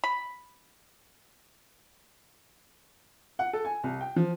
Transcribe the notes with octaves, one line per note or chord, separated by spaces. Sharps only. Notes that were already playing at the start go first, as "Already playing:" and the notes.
B5
F#5
A4
G#5
C2
G5
F3